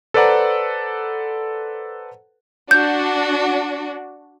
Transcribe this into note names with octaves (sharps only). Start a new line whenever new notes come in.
A4 B4 C5 D5 F#5 A#5
D4 F#4 G6